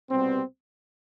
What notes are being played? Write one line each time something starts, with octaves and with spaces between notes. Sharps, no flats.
C2 B2 G3 B3 C4